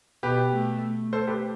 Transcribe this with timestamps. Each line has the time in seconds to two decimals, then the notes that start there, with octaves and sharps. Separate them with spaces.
0.23 B2 G4 B4
0.53 A3
1.13 A4 C5
1.27 G4 B4